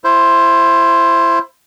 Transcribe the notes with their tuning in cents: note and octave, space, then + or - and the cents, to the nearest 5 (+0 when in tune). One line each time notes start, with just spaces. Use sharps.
E4 +25 C5 +10